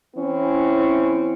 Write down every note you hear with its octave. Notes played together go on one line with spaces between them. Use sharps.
E3 C4 C#4 E4